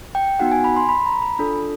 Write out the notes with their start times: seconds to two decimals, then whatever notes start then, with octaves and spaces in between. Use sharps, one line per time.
0.15 G5
0.39 B3 D#4 F#4 F#5
0.52 G#5
0.64 B5
0.77 C6
0.89 B5
1.06 A#5
1.22 B5
1.39 D4 F4 A4